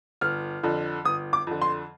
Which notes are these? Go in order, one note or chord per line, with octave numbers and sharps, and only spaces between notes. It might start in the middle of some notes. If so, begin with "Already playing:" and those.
G1 F6
F2 D3
G1 D#6
D6
F2 D3
C6